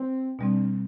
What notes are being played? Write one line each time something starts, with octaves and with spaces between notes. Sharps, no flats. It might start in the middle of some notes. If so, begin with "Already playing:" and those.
Already playing: C4
B2 G3 C4 D4